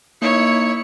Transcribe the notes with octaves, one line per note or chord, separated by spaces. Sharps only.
A#3 D#4 E4 C#5 C#7